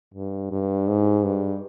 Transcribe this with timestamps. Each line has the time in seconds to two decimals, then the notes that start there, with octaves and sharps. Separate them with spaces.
0.14 G2
0.52 G2
0.88 G#2
1.25 G2